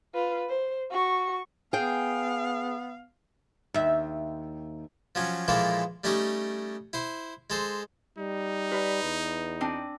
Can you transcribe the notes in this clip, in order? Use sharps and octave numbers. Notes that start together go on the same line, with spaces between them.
F4 B4
C5
F#4 C#6
B3 G#4 F5 G5
D#2 E5
F3 F#3 C#4
A#2 E3 F3 G#3 A#3 A4
G3 A3 C#4 D#4 G4 C#5
E4 C5
G#3 A4 C5
G3 D#4
G4 B4 D5
E2
C4 D4 G#5